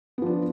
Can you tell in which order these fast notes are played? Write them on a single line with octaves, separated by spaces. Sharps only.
B3 F3 D4